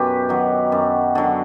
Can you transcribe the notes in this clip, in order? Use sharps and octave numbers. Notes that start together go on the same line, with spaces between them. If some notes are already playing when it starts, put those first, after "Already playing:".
Already playing: F#2 B2 G4 B4
D#3 F#3
F#2
D3 F#3